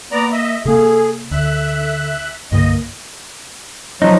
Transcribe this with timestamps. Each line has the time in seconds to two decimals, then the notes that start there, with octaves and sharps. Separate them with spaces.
0.12 A#3 B3 D5 A#5
0.32 D#5 E5
0.65 C3 A#3 G#4 A4
1.31 D2 D3 E5 F#6
2.52 C2 G2 D3 A#3 D#5
4.02 F3 F#3 D#4